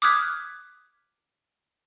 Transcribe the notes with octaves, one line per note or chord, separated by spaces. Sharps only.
D6 D#6 F6 F#6 G#6 B6